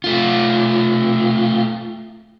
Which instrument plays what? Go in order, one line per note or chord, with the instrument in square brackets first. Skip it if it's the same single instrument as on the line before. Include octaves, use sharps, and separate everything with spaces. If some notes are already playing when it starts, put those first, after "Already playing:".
[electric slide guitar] A3 F4